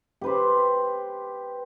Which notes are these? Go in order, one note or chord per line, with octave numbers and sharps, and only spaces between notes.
G4 B4 C5